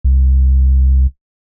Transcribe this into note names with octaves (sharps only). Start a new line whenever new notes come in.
C2